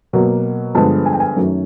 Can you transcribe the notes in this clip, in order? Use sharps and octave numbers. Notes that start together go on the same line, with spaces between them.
B2 F#3 A#3
G2 D3 F3 G#3 B3 A5
G#5
G5
G#5
F#2 D#3 F#3 A3 C#4